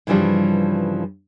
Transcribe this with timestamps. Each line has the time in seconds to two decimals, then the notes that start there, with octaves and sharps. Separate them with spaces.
0.07 G2 C#3 E3 F3 G3